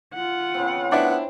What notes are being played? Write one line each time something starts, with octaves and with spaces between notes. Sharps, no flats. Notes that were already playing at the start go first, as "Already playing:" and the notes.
F4 F#5
C#3 B3 C4
B3 D4 E4 C5